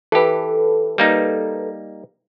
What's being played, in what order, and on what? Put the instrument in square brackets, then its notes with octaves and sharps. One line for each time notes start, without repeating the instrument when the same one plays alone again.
[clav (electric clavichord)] E3 G4 [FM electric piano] A4 B4
[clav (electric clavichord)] G3 A#3 D#4